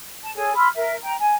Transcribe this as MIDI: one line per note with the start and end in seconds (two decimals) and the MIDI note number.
0.22 0.31 81
0.35 0.55 68
0.35 0.55 69
0.35 0.55 73
0.35 0.55 80
0.55 0.67 83
0.55 0.67 84
0.55 0.67 88
0.55 0.67 89
0.74 0.95 70
0.74 0.95 76
1.02 1.14 79
1.02 1.14 82
1.20 1.34 80